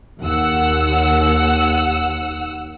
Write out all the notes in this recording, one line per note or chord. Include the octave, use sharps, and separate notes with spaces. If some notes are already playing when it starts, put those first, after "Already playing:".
D#2 F#5 E6